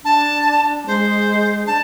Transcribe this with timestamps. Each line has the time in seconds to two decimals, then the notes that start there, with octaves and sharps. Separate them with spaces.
0.04 D4 A5
0.87 G#3 C5
1.66 D4 A5